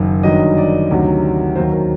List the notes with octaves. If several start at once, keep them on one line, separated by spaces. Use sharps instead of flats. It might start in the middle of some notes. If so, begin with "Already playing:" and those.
Already playing: F#1 F#2 D#3
G1 G2 D#3 F#3 D#5
D5
D2 C3 D#3 F#3
D#2 D#3 F#3 C5
A#4